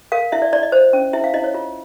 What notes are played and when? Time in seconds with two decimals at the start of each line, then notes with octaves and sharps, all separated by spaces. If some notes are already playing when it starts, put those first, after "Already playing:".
0.12 A#4 F5
0.32 E4 E5
0.42 D5
0.53 E4 D5
0.63 D#5
0.72 C5
0.93 C#4
1.13 E4 E5
1.24 F5
1.34 E4 D#5
1.44 C#5
1.54 F4